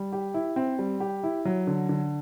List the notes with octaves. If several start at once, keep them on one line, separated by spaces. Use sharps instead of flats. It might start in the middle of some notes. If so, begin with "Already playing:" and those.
Already playing: G3
G4
E4
C4
G3
G4
E4
F#3
D3
D3